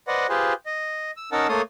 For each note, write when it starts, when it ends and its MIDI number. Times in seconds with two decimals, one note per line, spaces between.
0.08 0.27 71
0.08 0.27 72
0.08 0.27 74
0.08 0.27 75
0.08 0.27 78
0.29 0.53 65
0.29 0.53 67
0.29 0.53 68
0.29 0.53 71
0.29 0.53 72
0.66 1.11 75
1.17 1.30 88
1.32 1.47 61
1.32 1.47 63
1.32 1.47 70
1.32 1.47 78
1.32 1.47 81
1.32 1.47 88
1.49 1.62 57
1.49 1.62 58
1.49 1.62 69
1.49 1.62 73
1.49 1.62 84
1.49 1.62 87